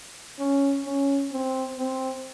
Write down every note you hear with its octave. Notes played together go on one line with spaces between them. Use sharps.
C#4
C#4
C4
C4